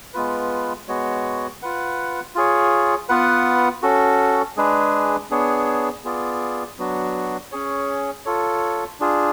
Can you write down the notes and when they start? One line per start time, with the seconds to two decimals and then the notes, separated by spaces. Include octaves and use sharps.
0.14 G#3 B3 F4 B4
0.88 G#3 B3 F#4 C#5
1.62 F4 B4 F#5
2.35 F4 G#4 C#5
3.09 B3 F4 B4 F#5
3.82 C#4 F#4 A4
4.57 G#3 D4 G#4 B4
5.30 B3 D4 G#4 C#5
6.05 B3 F4 G#4 D5
6.78 F#3 B3 D4 F#4
7.52 C#4 G#4 C#5
8.25 F4 A4 C#5
9.00 D4 F4 G#4